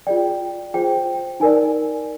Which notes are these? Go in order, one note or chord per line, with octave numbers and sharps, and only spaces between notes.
F4 G#4 D5 G5
F4 G#4 C5 G5
D#4 A#4 D5 G#5